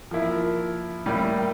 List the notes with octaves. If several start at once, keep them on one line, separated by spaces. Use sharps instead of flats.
F3 A#3 E4
A2 G3 A#3